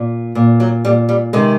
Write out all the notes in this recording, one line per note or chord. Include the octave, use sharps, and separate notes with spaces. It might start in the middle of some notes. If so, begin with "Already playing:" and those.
Already playing: A#2
A#2
F#3
A#2 G3
G3
C3 D#3 G#3